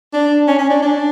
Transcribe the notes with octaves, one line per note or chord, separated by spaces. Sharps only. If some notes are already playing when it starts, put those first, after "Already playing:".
D4
C#4
C#4
D4
D4